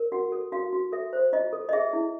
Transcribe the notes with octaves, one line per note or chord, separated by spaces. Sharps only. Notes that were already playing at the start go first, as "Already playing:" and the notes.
Already playing: A#4
F#4 F#5
A4
F#4 F5
F#4
A4 E5
C5
F4 D#5
A4
D#5
G#4 E5
E4